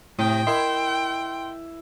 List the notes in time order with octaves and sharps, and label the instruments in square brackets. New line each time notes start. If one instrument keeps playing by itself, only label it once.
[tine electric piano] A2 [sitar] C3 [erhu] G5 [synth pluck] D#6
[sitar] E4 [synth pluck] A#4 D#5 [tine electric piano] C6